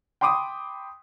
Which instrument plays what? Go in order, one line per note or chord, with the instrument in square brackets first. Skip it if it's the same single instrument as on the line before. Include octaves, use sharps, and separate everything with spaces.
[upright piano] G5 B5 C6 D6 D#6